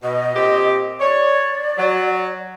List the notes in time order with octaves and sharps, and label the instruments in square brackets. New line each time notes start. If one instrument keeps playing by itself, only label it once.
[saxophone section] B2 [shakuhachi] D#5
[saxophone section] A#2 C4 G4
[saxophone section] C#5 [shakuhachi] D5
[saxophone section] F#3